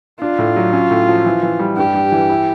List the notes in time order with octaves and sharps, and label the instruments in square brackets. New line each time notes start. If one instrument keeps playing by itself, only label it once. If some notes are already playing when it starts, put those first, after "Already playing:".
[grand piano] D4 [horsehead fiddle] F4
[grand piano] A2
F#3
C#4
A2
F3
E3
E3
G3
[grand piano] G2 [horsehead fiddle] G4
[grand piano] G2
E3
E4